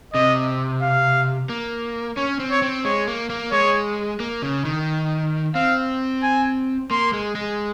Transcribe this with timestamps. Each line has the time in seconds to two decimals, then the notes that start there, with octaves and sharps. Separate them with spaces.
0.14 C3 D#5
0.82 F5
1.49 A#3
2.17 C#4 C#5
2.40 C4
2.51 C#5
2.62 C4
2.85 G#3 C#5
3.07 A#3
3.30 A#3
3.52 G#3 C#5
4.20 A#3
4.42 C#3
4.65 D#3
5.55 C4 F5
6.23 G#5
6.91 A#3 C6
7.13 G#3
7.35 G#3